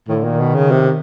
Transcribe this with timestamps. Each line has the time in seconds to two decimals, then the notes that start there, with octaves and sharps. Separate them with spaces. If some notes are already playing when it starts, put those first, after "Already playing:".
0.09 A2 D#3
0.17 D3
0.24 A#2 D#3
0.40 B2
0.55 C#3
0.71 C3